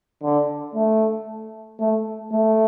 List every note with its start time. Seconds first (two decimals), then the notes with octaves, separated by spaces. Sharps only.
0.22 D3
0.75 A3
1.80 A3
2.32 A3